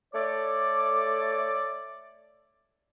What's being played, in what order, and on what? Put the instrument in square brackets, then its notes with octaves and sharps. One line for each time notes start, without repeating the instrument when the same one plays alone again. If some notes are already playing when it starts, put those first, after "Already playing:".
[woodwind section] A3 A4 C#5 D5